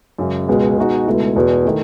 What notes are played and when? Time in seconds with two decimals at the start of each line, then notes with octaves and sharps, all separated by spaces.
0.18 F#2 C#3 G#3
0.48 C#2 B2 G#3
0.77 B2 G#3 D#4 F#4
1.06 C#2 B2 A3 E4
1.36 E2 B2 G#3
1.65 D#3 A3 E4